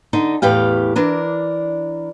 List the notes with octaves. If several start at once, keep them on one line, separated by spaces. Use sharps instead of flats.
D3 D#4
E2 A2 E3 G4 F5
E3 D4 A#4